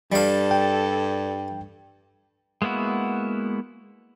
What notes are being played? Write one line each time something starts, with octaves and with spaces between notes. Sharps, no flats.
G2 G3 A4 F5
G5
G#3 A#3 B3 E4 F#4